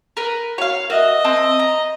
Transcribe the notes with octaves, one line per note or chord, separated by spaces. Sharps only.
A#4 B4
F#4 C#5 F5 F#5
F#4 A#4 D#5 E5
C4 A5 C6
A#5